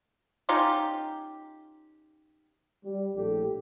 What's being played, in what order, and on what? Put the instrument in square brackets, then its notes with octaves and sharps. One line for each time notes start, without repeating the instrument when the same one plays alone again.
[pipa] C#4 D#4 F4 G4
[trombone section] G3
A#1 A2 G4 A4